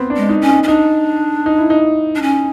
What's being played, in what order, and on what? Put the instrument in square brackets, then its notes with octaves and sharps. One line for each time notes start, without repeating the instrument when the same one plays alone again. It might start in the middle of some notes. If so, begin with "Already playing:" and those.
Already playing: [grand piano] B3 C4
D4
[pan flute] G#3
[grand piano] D#4
[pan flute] C#4
[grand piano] D#4
[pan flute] C#4
[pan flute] D4 [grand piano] D#4
[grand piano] D#4
E4
D#4
[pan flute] D4
C#4